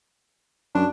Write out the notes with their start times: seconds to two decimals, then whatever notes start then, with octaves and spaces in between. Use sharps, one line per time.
0.75 F#2 D4